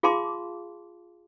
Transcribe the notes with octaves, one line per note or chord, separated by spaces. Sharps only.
F4 G#4 F5 A5 C6 D6